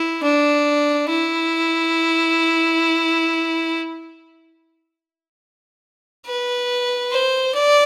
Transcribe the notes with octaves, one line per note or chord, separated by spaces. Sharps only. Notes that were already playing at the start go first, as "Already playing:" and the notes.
Already playing: E4
D4
E4
B4
C5
D5